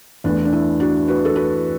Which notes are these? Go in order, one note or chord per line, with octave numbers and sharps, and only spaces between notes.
E2 E3 A3 D4
D4
E4
D4 F#4
F#4 B4
A4
F#4 B4